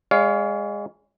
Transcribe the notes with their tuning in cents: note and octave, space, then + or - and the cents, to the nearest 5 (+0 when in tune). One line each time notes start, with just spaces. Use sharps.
G#3 -20 C#5 +35 F5 +0